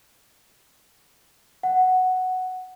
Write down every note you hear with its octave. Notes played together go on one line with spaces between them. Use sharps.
F#5